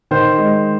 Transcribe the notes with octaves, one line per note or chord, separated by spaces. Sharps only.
D#3 C5
G#3